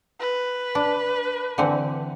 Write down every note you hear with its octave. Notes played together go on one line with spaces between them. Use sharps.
B4
D4
D3 E3 C4